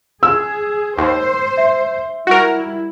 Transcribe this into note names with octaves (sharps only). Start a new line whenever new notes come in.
G#4 E6
D#2 C5
E5
G3 E4 F#4 A#4